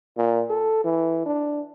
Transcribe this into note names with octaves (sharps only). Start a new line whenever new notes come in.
A#2
A4
E3
D4